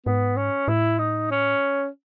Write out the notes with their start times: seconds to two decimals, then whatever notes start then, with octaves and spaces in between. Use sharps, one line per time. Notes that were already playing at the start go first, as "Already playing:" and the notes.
0.06 G#2 B3
0.37 C#4
0.68 A2 E4
0.99 D#4
1.31 C#4